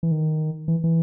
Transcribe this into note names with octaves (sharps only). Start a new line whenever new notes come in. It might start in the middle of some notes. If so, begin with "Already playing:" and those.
E3
D#3
E3
E3